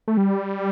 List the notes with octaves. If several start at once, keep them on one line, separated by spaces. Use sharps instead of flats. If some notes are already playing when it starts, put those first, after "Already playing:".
A3
G3